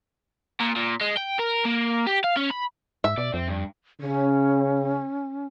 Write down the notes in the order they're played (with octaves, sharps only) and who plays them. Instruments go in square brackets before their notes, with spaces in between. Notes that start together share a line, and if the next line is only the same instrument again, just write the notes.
[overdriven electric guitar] A#2
A#2
G#3
G5
A#4
A#3
G4
F5
C#4
B5
[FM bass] G#2 [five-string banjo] E5
[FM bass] B2 [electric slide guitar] D5
[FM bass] F2 [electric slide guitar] C4
[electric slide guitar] G2
[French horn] C#3 [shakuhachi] C#4